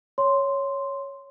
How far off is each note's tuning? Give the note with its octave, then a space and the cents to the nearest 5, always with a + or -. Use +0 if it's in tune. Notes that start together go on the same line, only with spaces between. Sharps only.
C#5 +0 C6 +0